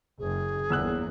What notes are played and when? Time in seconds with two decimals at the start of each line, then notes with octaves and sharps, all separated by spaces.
0.19 F#1 G#4
0.70 G1 E2 E3 A#3 E6 F#6